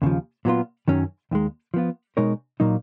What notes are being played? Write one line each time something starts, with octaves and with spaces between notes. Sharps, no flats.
D#2 C#3 F3
A#2 F#3 B3 F4
F#2 D#3 F#3 C#4
D#2 D#3 G#3
F3 B3 F4
B2 G#3 D#4 A#4 C#5
A#2 F#3 A#3 D#4